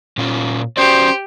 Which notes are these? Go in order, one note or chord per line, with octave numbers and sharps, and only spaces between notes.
A#2 C#4 F4
C#4 F#4 G4 C5 D5